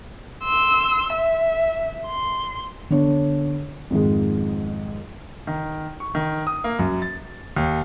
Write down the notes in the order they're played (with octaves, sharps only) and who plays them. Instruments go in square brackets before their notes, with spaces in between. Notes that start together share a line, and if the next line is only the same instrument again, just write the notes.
[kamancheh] C6 E6
E5
C6
[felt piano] D3 B3 D4 C#5
F2 G#2 D#3 G#3
[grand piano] D#3
C#6
D#3
D#6
A#3
F#2
A6
D#2